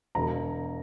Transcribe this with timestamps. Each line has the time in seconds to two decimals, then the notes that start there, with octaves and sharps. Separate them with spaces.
0.15 E1 A#5